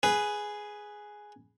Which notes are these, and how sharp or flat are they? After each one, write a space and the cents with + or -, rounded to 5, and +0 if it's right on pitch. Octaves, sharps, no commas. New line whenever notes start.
G#4 +5 B4 +0